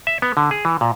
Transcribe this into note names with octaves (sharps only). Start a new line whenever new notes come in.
E5
B3
D3
G#4
E3
A#2